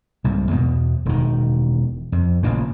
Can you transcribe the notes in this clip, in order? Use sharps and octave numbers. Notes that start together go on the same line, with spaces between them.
C2 G#2
E2 B2
E1 D#3
F2
A1 A#2 C#3 E3